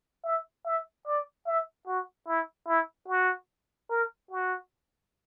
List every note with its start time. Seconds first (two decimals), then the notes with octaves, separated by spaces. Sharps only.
0.24 E5
0.65 E5
1.07 D5
1.47 E5
1.87 F#4
2.28 E4
2.68 E4
3.08 F#4
3.90 A#4
4.31 F#4